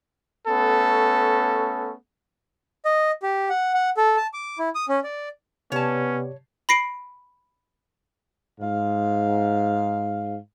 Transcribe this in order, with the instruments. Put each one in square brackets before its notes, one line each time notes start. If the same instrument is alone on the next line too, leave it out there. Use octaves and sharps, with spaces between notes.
[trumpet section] A3 B3 C#4 A4
[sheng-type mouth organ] D#5
G4
F#5
F#5
A4
A5
D6
E4
D#6
C#4
D5
[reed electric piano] C3 G4 D5 [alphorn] B3 [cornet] C#4 [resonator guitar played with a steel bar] C#5 A5
[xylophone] B5 A#6 C7 D7
[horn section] G#2 F5